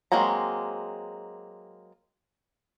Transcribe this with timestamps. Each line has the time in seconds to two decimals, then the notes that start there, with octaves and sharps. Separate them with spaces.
0.12 F#3 G#3 A#3 C4 A#5